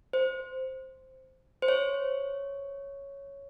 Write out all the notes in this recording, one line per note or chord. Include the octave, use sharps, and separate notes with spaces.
C5
C5
C#5